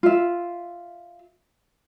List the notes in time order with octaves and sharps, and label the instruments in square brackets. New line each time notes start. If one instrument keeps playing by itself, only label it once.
[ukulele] F4 E5